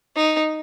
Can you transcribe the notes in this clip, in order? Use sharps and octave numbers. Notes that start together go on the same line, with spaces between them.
D#4